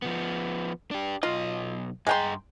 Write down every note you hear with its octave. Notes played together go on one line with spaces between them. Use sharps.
F3 B3
D4 G4
B1 F4 D#5
G2 G#3 G5 A#5 C6